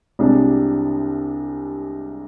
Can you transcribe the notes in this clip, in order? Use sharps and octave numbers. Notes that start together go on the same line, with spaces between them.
C2 C3 G#3 D4